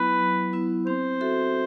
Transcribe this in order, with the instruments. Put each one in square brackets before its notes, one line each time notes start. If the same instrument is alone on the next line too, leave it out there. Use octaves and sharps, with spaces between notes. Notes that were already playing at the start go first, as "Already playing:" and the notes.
Already playing: [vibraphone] F#3 B3 E4 [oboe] B4
[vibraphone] F#3
B3 E4
[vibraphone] C4 [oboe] C5
[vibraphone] F#4 A4 E5